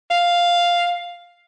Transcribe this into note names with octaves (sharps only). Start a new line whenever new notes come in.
F5